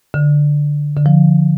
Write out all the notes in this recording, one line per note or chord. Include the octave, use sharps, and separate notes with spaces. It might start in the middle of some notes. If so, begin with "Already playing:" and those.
D3
D3
F3